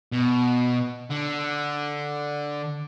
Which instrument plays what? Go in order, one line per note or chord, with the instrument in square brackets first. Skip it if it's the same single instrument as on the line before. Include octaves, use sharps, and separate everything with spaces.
[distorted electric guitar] B2
D3